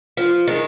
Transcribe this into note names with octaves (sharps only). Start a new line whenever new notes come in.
F3
D#3 G#3